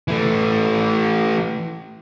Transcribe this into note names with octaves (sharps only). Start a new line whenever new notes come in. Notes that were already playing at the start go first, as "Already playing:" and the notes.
E3 A3